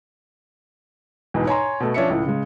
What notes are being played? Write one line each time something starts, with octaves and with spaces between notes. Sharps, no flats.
B1 E2 G#2 B2
C#5 G#5 A#5 C6
B2 A3
F3 C#4 D4 E5 C#7
C#2 A2
C#3 G#3